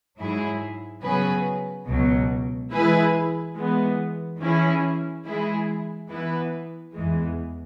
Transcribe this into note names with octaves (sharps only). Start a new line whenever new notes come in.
G#2 F#3 E4 G#4
C#3 F#3 B3 G#4 B4
C#2 B2 F#3
E3 G#3 E4 G#4 B4
E3 G#3 B3
E3 C#4 E4 G#4
E3 G#3 E4 G#4
E3 B3 E4 B4
E2 E3 G#3